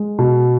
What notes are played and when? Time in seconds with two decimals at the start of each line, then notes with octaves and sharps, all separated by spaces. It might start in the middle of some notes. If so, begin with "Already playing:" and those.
Already playing: G#3
0.19 B2